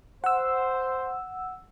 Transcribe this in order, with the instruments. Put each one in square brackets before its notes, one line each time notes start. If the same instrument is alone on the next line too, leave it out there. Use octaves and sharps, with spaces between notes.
[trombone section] C5 [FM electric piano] F#5 E6